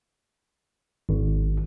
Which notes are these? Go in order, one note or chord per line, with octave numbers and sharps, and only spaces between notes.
G#1